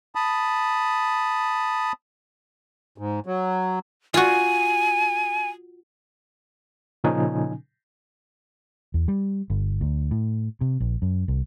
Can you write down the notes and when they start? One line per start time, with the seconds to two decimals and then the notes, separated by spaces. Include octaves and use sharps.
0.15 A5 B5 D#6
2.98 G#2
3.26 F#3
4.14 F4 F#4 G#5
7.04 A#2 C#3 F3 C#4 D#4 G#5
8.94 E2
9.08 G3
9.50 G1
9.81 D2
10.11 A2
10.61 C3
10.80 A#1
11.02 F#2
11.28 C2